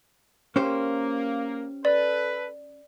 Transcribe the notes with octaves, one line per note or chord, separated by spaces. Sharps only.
A#3 C#4 G4 C5
A4 B4 D5